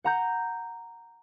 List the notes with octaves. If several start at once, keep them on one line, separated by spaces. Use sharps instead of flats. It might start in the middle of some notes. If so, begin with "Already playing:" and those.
F#5 A#5 G6